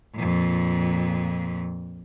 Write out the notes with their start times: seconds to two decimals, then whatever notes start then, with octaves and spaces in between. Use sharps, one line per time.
0.15 F2 A#2